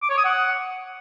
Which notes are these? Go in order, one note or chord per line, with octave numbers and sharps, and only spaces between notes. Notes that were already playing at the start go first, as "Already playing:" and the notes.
D6
C#5
D#6
F#5